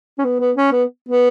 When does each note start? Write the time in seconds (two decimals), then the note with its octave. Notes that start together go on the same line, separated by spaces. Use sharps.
0.19 C#4
0.24 B3
0.40 B3
0.56 C#4
0.72 B3
1.09 B3